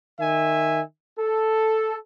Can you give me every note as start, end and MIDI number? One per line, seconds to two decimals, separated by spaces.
0.20 0.81 51
0.20 0.81 76
0.20 0.81 80
1.18 1.96 69